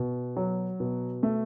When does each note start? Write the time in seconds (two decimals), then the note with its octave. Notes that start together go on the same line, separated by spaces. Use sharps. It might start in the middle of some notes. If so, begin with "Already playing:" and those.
Already playing: B2
0.37 F#3
0.80 B2
1.23 A3